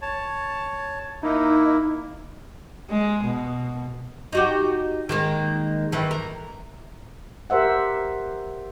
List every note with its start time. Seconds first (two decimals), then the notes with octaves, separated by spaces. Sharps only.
0.02 C#5 A5
1.23 A#3 D#4 E4
2.90 G#3
3.24 B2
4.32 D#4 F#4 G4
5.09 D#3 G#3 A#3
5.92 D#3 E3
6.11 A#4
7.50 G4 A#4 C5 E5 F#5